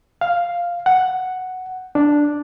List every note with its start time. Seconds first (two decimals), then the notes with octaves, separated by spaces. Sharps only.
0.21 F5
0.86 F#5
1.95 D4